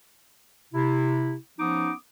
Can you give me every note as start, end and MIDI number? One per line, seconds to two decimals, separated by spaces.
0.74 1.34 48
0.74 1.34 64
1.59 1.92 53
1.59 1.92 59
1.59 1.92 61
1.59 1.92 63
1.59 1.92 86
1.59 1.92 87